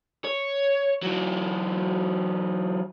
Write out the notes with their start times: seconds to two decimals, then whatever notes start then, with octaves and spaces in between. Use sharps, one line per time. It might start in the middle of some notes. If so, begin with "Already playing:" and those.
0.25 C#5
1.03 E3 F#3